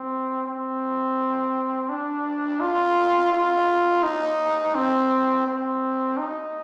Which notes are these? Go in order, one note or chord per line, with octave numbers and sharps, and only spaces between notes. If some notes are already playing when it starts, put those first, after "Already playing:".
Already playing: C4
C4
D4
F4
F4
D#4
C4
C4
D#4